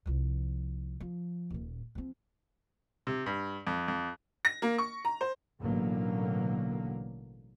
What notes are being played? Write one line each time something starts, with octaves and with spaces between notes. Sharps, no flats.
C2 F3
F3
D#1 A#2
F3 C4
C3
G2
F2
F2
A#6
A#3
C#6
A#5
C5
A1 B2 D3 F#3 A#3